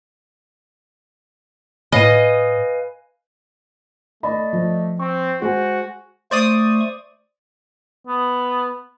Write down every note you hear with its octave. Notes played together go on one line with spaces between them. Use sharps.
A2 B4 D#5 F5 G#5
A3 D5 D#5 B5
F3
C4 C#6
G#3 F#4 C5 F#5 G#5
A3 C5 D5 C#6 D#6
B3